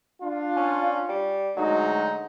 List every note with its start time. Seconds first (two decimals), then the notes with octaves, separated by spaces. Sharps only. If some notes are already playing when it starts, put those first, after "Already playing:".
0.22 D4 F4
0.56 C#4
1.09 G3
1.56 D2 F#3 G#3 D#4